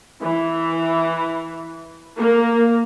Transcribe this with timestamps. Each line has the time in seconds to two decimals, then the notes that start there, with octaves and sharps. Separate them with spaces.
0.21 E3
2.18 A#3